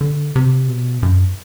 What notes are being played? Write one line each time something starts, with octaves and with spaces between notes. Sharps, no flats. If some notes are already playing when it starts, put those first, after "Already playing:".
D3
C3
B2
F#2